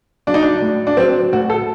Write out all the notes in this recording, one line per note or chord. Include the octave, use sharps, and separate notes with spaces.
F#3 D4
D#4
D4
A2
D4
F#3 C4
A2 F#4
A4